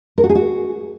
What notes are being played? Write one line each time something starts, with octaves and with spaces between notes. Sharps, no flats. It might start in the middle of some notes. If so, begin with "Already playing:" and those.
A#4
F#4
G#4
F#4